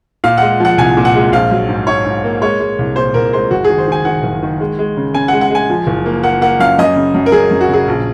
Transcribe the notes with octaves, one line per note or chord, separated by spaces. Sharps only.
A#2 F5
G#3 F#5
F3 F#5
C2 G#5
A#2
F#5
G#3
A#1 F5
F#3
G#2
G#2 C#5
G#2
A#3
G#3 C#5
G#3
C2
A#2 C5
C2 A#4
G#3 C5
F#1 F#4
G#4
D#3
C5
D#3 G#5
D#3 F#5
F#1
D#3
G#3
G#3
C#3
C#3 G#5
F#5
G#3
F#5
G#3 G#5
F3
F#1
A#3
A#3 F#5
A#3 F#5
F#2 F5
F#2 D#5
C#3
F#2
A#4
F#2 G#4
F#2
F#4
C#3 G#4
A#1